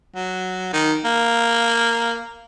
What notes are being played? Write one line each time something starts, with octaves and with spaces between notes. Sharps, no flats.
F#3
D#3
A#3